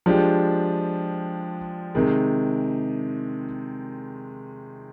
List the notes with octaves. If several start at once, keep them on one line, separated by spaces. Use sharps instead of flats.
F3 G#3 D4 G4
C3 D#3 G#3